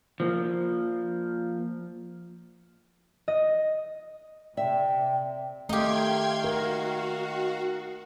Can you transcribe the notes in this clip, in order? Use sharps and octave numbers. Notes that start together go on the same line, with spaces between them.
F3 A#3
D#5
C3 D5 E5 G5
D#3 A3 D#4 G4 F5 G5 C6 G#6
F#4 A#4